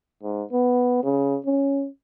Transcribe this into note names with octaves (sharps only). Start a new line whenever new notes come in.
G#2
B3
C#3
C#4